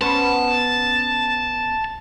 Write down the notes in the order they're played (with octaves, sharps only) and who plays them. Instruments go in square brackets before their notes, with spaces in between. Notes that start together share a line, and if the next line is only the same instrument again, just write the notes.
[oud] B3 C#4 C5 [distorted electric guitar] A5